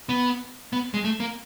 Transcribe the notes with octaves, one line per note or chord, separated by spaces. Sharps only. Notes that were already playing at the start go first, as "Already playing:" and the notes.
B3
B3
G#3
A3
A#3